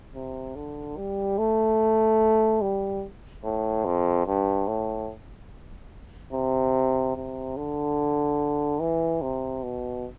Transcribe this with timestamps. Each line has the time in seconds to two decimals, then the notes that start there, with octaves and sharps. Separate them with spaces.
0.15 C3
0.56 D3
0.97 G3
1.38 A3
2.62 G3
3.44 A2
3.86 F2
4.27 G2
4.68 A2
6.33 C3
7.16 C3
7.57 D3
8.81 E3
9.22 C3
9.63 B2